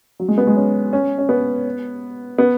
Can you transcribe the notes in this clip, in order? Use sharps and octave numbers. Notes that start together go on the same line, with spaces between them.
F#3
G#3
B3
G#3
C#4
C#4
C#4
B3
B3